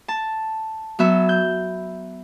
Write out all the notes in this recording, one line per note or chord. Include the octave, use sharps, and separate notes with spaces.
A5
F#3 B3 E5
G6